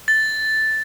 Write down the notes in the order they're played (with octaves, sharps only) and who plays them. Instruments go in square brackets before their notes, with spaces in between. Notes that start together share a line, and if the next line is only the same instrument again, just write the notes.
[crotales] A6